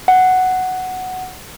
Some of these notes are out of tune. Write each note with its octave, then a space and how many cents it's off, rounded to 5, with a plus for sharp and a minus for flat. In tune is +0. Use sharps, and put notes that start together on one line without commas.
F#5 +5